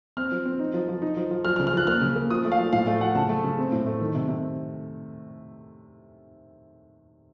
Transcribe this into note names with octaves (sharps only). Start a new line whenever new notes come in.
C4 F6
F3
C4
D#4
F3
F3
D#4
F3
F3
F3 F6
F6
C#3
F6
F3 F#6
A#3 F6
C#3
A#3
F3 D#6
A3
F5
F3
A2 F5
A3 F5
F3 F#5
C#3 A5
A3
C#3
C4
A2
A3
D#3
C3
C3